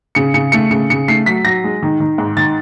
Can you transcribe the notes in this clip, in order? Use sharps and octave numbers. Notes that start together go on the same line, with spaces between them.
C#3 C#7
C#3 C#7
A3 C#7
C#3 C#7
C#3 C#7
A3 C7
F#3 B6
F#3 A#6
G#3
D#3
D#3
G#2
D#3 A6